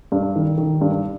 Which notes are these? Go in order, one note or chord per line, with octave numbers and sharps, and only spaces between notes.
G2
D#3
D#3
G2